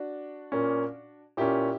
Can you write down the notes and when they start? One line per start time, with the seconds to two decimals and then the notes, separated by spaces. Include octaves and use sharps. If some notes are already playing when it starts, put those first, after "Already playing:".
Already playing: D4 F#4
0.52 A#2 A#3 C#4
1.37 A#2 A#3 C#4 E4 G4